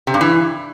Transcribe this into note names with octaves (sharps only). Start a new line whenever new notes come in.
C3
G2
E3